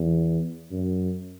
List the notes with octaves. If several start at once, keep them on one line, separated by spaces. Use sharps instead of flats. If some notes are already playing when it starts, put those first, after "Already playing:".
Already playing: E2
F#2